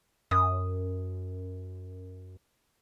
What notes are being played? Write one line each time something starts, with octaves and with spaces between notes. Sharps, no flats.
F#2 D#6